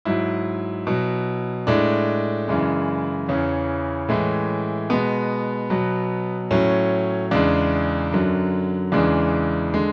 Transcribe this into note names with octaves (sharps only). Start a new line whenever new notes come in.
G#2 F#3 E4
B2 F#3
A2 G#3 D4
F#2 C#3 E3 G#3
E2 C#3 E3 C#4
A2 E3 G#3
B2 G#3 B3
B2 F#3
A2 F#3 C#4
E2 C#3 G#3 D4
F#2 D3 F#3
E2 C#3 E3 G#3 D4
D3 G#3